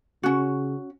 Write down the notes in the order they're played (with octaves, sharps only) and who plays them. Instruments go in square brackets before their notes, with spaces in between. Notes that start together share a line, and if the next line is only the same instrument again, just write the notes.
[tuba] C#3 [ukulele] C#4 F#4